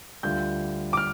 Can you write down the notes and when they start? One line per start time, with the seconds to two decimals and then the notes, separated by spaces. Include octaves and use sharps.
0.23 D2 D3 G3 F4 G6
0.93 D6
0.97 F6